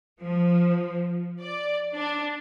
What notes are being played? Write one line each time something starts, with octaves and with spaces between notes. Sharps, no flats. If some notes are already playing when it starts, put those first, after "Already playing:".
F3
D5
D4